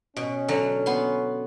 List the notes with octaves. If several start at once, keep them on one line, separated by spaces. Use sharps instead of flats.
B2 C#4
D3 F#3
B3 C6